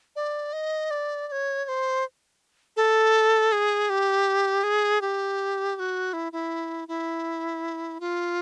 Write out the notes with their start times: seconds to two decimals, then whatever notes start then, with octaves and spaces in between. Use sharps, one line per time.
0.16 D5
0.53 D#5
0.91 D5
1.28 D5
1.32 C#5
1.65 C#5
1.68 C5
2.77 A4
3.52 G#4
3.90 G4
4.64 G#4
5.01 G4
5.76 G4
5.80 F#4
6.13 E4
6.32 E4
6.88 E4
8.00 F4